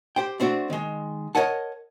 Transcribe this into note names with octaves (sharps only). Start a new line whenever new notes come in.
G4 C5 G5
A3 C4 D4 F#4
D#3 G#3
A#4 C5 C#5 D#5 F#5 A5